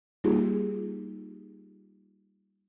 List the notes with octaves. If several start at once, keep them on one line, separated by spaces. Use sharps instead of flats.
G3 A#3 D#4 F4 G4 G#4